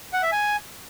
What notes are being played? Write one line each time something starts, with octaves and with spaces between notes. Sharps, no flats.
F#5
E5
G#5